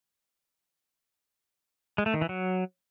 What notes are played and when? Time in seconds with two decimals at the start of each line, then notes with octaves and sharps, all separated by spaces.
1.98 G#3
2.06 A3
2.14 D#3
2.21 E3
2.29 F#3